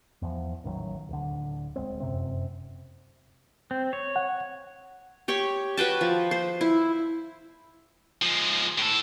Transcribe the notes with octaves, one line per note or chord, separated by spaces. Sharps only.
E2 F3
A1 D#3 E3 F#3
D1 D3
D#1 F2 G#3 C4
F1 F#2 C3 C4
C4
C#5
F#5
G4 C#5 G5
F#4 B4 G5 A5
F3
C5
E4
F3 G#3
A2 A4